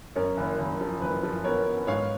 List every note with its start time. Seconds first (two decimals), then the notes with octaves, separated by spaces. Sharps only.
0.16 F#2 A#4 C#5
0.37 F#1
0.59 F#1
0.81 F3
1.01 F#1 B4
1.23 F3
1.44 B3 A#4 C#5
1.67 B3
1.87 G#2 C#5 F5